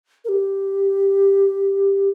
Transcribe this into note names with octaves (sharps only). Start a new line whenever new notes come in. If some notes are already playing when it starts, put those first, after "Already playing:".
A#4
G4